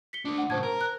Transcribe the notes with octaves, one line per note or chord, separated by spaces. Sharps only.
B6 C#7 G7
A3 D4
F#5
A2 C#3 C5 A5 G#6
A#4
F#6